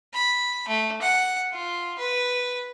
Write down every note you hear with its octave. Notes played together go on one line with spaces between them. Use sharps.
B5
A3
F#5
F4
B4